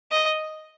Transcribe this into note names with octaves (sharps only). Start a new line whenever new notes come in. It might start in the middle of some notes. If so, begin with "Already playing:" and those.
D#5